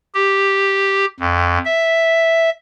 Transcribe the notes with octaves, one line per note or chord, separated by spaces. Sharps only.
G4
F2
E5